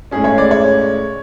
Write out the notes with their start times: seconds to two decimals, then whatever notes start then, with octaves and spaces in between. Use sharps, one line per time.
0.11 A2 G#3 C#4 G#4
0.24 C#5
0.38 D5
0.51 C#5